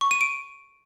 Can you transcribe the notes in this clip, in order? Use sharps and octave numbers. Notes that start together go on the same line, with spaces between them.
C#6
D#7
D7